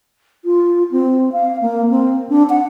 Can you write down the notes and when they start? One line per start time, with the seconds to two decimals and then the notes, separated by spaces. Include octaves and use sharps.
0.45 F4
0.91 C4
1.32 F5
1.61 A#3
1.90 C4
2.29 D4
2.49 F#5